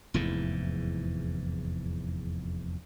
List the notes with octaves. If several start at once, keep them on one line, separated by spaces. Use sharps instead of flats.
F1 E2 G#2 E3